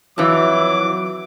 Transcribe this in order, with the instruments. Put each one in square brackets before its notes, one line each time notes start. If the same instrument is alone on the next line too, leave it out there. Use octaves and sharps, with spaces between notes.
[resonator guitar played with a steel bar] F2 E3 [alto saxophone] F#3 [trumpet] D6